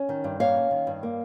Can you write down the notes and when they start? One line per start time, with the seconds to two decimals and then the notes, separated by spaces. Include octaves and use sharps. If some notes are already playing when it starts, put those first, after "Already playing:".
Already playing: C#4 C#5
0.09 D#3
0.24 G2
0.40 A#3 C#5 F5
0.56 C#4
0.71 D#3
0.87 G2
1.03 A#3